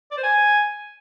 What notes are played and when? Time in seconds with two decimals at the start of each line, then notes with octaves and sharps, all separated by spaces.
0.11 D5
0.17 C5
0.23 G#5